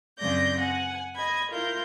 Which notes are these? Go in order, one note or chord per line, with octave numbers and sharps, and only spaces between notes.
F#2 C#3 C4 D5 G6 A#6
F#5 G#5
D#5 B5 G#6
E4 F4 A#4 G6